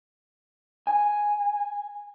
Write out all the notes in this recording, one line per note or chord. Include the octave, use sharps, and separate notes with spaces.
G#5